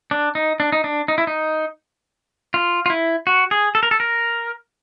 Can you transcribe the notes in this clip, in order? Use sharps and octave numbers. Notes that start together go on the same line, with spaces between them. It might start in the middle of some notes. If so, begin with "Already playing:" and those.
D4
D#4
D4
D#4
D4
D#4
E4
D#4
F4
F4
E4
F#4
G#4
A4
A#4
A4
A#4